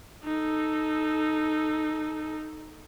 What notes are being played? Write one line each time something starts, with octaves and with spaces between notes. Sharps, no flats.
D#4 A4